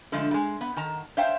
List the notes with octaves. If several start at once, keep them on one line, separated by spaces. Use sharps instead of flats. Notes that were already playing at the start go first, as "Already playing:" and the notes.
D3 F3 G#3 A3
G3 G#3
B3
D#3 A5 A#5
C5 C#5 E5 F5 G5 A5